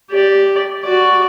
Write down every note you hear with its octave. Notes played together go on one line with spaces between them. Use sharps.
G4 D5
F#4 D5